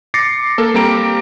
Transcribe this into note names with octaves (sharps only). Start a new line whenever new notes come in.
D6 A6 A#6 C7 C#7
A#3 A4
G3 A#3 C4 G4 A#5 D7